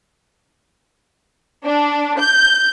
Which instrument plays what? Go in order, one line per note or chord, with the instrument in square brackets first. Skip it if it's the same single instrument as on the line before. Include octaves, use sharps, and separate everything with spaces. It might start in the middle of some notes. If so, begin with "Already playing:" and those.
[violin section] D4
G6